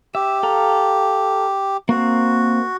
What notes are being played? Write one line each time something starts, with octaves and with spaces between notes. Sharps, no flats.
G4 E5
A4 F5 A#5
A#3 C4 F#4